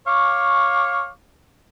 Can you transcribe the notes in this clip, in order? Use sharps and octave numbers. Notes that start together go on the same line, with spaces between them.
C#5 F5 C#6 D6